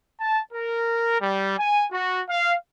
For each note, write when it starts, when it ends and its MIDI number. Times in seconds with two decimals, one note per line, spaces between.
0.21 0.40 81
0.53 1.17 70
1.20 1.57 55
1.58 1.85 80
1.91 2.20 66
2.29 2.54 77